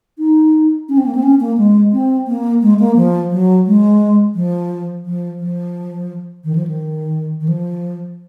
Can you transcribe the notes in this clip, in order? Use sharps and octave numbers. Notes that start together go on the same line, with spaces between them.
D#4
C#4
C4
A#3
C4
C#4
A#3
G#3
C4
A#3
G#3
A#3
F3
F#3
G#3
F3
F3
F3
D#3
F3
D#3
D#3
F3